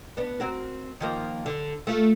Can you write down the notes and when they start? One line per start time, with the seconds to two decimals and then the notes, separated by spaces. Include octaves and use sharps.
0.17 B3 D4
0.40 C4 F#4 A#4
1.00 D#3 F3 A#3
1.46 D3
1.87 A3 F4